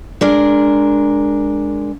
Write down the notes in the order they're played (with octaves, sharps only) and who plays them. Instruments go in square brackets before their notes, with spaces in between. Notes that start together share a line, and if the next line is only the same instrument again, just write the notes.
[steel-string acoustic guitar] G#3 D4 A#4